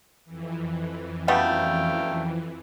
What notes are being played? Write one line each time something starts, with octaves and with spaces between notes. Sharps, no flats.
F2 E3
F#2 G3 A3 B3 F5 G5